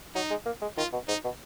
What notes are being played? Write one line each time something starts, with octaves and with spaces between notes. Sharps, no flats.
F#3 D#4
G#3
A#3
G#3
D#3 F4
B2
G#2 D#4
B2